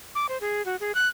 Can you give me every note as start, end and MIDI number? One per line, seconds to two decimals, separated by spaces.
0.15 0.27 86
0.29 0.38 72
0.41 0.65 68
0.65 0.76 66
0.80 0.92 68
0.95 1.08 90